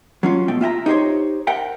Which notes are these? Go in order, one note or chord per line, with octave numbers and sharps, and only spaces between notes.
F#3 C#4 F4
B2 A3 G5
F4 E5 G5 A#5
D#4 G4 C5 C#5
A#4 E5 F#5 G5